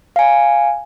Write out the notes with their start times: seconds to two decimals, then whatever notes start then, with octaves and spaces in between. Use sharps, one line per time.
0.16 F5 G#5